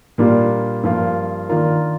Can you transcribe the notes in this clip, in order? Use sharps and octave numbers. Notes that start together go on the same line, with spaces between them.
A#2 G3 A#3 D4 F4
G2 F3 A#3 F4
D#3 A#3 D4 F4 A#4